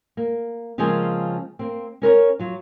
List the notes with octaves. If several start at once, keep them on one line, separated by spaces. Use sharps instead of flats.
A#3
C#3 F3 G#3 A#3 C4 G#4
A#3 C4
C#4 A#4 B4 C#5
F#3 F4